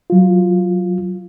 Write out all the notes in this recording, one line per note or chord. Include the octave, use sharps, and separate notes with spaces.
F#3 F4